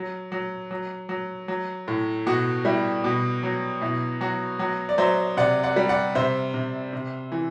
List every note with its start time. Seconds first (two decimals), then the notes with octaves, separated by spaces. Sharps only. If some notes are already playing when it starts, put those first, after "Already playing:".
Already playing: F#3
0.32 F#3
0.71 F#3
1.09 F#3
1.48 F#3
1.88 A2
2.26 B2 F#4
2.65 G3 E4
3.04 B2 F#4
3.43 F#3
3.81 B2 E4
4.21 F#3 F#4
4.59 F#3 F#4
4.89 D5
4.98 F#3 C5 E5
5.37 C3 D5 F#5
5.63 D5 F#5
5.76 G3
5.89 D5 F#5
6.15 C3 C5 E5
6.54 C3
6.93 C3
7.32 E3